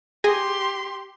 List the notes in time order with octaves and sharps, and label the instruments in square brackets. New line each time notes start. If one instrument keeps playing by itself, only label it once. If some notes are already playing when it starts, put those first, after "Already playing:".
[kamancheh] G4 C6 [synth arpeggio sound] G#4 G#5 A#6